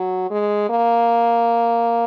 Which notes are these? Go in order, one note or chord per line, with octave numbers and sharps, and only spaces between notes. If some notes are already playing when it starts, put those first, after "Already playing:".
Already playing: F#3
G#3
A#3